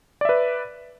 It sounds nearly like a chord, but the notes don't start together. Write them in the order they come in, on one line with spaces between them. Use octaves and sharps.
D5 E5 B4